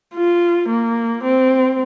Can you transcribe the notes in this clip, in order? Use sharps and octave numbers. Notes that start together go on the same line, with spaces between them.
F4
A#3
C4